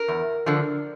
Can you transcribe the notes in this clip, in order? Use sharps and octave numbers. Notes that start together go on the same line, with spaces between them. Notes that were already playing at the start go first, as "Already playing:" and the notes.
Already playing: A#4
E2
D3 F3